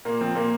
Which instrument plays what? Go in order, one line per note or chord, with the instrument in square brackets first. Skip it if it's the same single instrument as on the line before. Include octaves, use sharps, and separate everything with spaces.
[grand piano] A#2 A#3
F3 C4
A#2 A#3